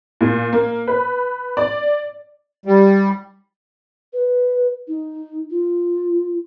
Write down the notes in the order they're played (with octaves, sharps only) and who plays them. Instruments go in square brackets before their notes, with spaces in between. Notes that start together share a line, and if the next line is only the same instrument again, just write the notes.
[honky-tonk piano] A#2
A#3
B4
D5
[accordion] G3
[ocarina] B4
D#4
F4